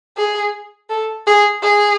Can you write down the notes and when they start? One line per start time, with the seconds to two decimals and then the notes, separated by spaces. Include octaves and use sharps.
0.17 G#4
0.90 A4
1.27 G#4
1.63 G#4